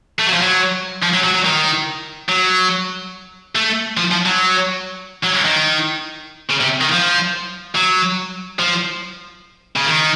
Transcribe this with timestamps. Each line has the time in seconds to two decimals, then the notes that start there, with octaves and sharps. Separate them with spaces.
0.19 A3
0.27 F#3
0.33 F3
0.42 F#3
1.03 F3
1.14 F#3
1.24 F#3
1.35 F#3
1.45 D#3
2.29 F#3
3.55 A3
3.97 F3
4.11 F3
4.26 F#3
5.23 F#3
5.45 D#3
6.50 C#3
6.60 C3
6.81 D#3
6.92 F3
7.75 F#3
8.60 F3
9.76 C#3
9.86 D#3